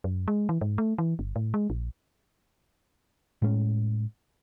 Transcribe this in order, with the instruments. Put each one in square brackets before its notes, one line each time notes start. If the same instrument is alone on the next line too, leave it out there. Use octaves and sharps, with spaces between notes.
[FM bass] F#2
G#3
E3
G#2
A3
E3
G1
A2
G#3
A#1
[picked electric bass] A2 G#3 A3 C#4